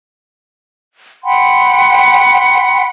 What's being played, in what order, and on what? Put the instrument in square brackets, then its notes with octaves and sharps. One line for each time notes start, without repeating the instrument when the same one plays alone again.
[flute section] F#5 G5 B5 C6